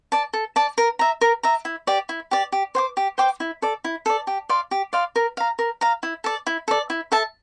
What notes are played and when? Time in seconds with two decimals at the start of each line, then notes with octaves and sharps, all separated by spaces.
0.12 D5 A5
0.33 A4
0.56 D5 A5
0.78 A#4
0.99 E5 A#5
1.21 A#4
1.43 E5 A#5
1.65 E4
1.87 G4 D5
2.09 E4
2.31 G4 D5
2.52 G4
2.75 C5 G5 D6
2.97 G4
3.18 C5 G5 D6
3.40 E4
3.62 A4 D5
3.84 E4
4.06 A4 D5
4.27 G4
4.49 D5 F5 C6
4.71 G4
4.93 D5 F5 C6
5.16 A#4
5.37 F5 A#5
5.59 A#4
5.81 F5 A#5
6.03 E4
6.24 A4 D5
6.47 E4
6.68 A4 D5
6.90 E4
7.12 A4 E5 A5